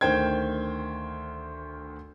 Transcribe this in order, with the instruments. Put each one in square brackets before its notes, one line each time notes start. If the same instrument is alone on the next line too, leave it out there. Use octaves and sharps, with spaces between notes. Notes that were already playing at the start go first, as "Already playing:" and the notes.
[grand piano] D2 D#3 C5 G5 G#6